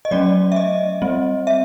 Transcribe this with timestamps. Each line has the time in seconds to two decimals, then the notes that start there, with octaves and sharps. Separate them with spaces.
0.05 D#5
0.11 F#3 A3 C#4 D5
0.52 E5
0.56 D#5
1.02 G3 C4
1.47 E5